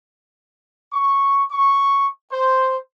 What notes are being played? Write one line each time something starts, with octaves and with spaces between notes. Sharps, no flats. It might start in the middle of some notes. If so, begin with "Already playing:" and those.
C#6
C#6
C5